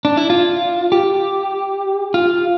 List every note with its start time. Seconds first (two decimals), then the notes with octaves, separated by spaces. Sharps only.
0.05 D4
0.17 E4
0.30 F4
0.92 G4
2.14 F4